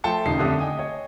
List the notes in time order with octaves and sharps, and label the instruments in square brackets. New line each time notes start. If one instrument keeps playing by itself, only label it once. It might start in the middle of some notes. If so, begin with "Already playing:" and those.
[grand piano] F3 A3 G5 A5 C6 C#7
D#1 C#3 D#4 C7
F2 D3 A3 G4 D#6
D#5 G5 G#5 D#6
C#5 D#5